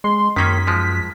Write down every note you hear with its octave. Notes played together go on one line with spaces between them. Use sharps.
G#3 C6
F#2 D#3 A#3 C#4 B6
F3 G#3